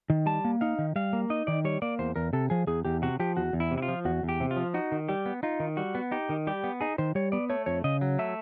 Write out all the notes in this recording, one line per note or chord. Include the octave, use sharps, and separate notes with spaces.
D#3
G3 A5
A#3
D#4 F5
D#3
G3 F5
A#3
D#4 D#5
D#3 D5
G3 C#5
A#3 D5
E2 C5
E2 A#4
C3 A4
F3 G#4
E2 G#4
E2 G4
C3 F#4
F3 G4
E2 F#4
E2
E4
C3
E4
F4
F3
E2 F#4
E2
G4
C3
F4
F3
D#4 F#4
D#3
G3 G4
B3
D#4 F4
D#3
G3 F#4
B3
D#4 G4
D#3
G3 G4
B3
D#4 G#4
D#3 C5
G3 C#5
B3 D5
A3 C#5
F2 C#5
C#3 D#5
F#3
A3 E5